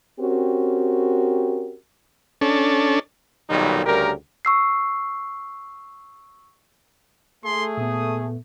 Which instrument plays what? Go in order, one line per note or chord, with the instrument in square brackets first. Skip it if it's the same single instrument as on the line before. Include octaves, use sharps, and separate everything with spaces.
[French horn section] C4 C#4 F#4 G4 A#4
[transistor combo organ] C#4 D4 A4
[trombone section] B1 A#2 D#3 F#3 G3 D#4
D2 C#3 G3 G4 A#4
[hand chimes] C#6 E6 C7
[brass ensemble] A3 [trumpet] G#4 [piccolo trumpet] C6
[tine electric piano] A#2 B3 [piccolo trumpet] D#6